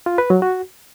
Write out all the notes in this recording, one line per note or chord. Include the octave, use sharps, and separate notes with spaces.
F4
B4
F#3
F#4